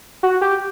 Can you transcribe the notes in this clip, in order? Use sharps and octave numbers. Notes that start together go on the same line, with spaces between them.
F#4
G4